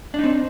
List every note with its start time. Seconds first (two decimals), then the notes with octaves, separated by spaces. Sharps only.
0.14 D4
0.19 D#4
0.24 C4